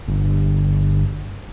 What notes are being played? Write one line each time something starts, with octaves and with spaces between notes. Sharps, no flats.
G1